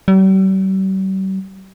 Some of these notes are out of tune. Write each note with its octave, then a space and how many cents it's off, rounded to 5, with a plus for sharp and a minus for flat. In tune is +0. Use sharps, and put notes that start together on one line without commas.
G3 -45